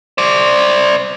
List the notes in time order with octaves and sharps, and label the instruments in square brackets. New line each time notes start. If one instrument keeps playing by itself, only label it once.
[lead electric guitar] C5 D5